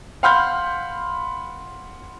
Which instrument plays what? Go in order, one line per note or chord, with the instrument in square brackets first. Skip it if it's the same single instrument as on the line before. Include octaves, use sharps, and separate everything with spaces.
[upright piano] F5 F#5 B5 C6 F6 G6